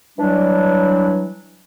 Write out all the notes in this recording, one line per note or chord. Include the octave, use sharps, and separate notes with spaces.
E3 F#3 G3 D4